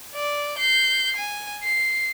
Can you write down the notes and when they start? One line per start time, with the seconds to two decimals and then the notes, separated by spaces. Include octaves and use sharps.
0.15 D5
0.58 G6 C7
1.17 G#5
1.63 C7